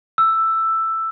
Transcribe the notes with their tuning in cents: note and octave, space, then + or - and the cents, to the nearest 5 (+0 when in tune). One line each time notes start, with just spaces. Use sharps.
E6 +5